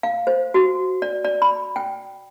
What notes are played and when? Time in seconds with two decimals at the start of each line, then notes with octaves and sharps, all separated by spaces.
0.03 F5
0.27 C5
0.54 F#4
1.02 D5
1.25 D5
1.42 B5
1.76 G5